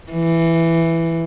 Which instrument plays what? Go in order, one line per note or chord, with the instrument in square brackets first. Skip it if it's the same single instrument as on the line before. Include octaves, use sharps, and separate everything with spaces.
[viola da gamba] E3